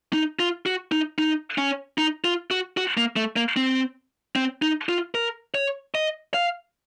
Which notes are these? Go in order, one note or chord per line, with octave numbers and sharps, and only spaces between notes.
D#4
F4
F#4
D#4
D#4
C#4
D#4
F4
F#4
F#4
A#3
A3
A#3
C4
C4
D#4
F4
A#4
C#5
D#5
F5